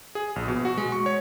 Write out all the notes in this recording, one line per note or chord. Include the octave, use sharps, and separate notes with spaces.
G#4
A#1
B2
F#4
G#3
C#6
C#5